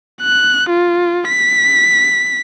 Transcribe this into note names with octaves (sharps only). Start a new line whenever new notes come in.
F#6
F4
B6